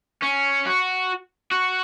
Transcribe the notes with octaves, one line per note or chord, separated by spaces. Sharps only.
C#4
F#4
F#4